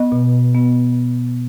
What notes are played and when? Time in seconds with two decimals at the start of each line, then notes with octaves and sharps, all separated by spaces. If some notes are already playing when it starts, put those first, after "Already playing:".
Already playing: B3 D#5
0.12 B2
0.55 B3